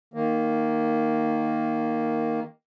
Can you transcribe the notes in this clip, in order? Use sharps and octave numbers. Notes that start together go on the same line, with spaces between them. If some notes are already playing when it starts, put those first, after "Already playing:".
D#3 A#3